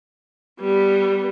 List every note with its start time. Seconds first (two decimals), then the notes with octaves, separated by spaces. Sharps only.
0.60 G3 B3